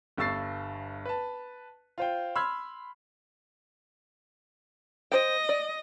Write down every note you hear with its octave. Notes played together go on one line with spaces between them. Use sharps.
G1 G2 C#6 E6 A6 C7
B4 A5
F4 C5 G5
B5 C6 E6 F6 G#6
C5 D#5 G5
D5